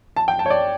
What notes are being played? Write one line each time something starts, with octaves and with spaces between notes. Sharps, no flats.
A5
G5
A5
C#5
D5